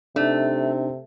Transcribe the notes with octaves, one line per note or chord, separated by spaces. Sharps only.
C3 A3 D4 D#4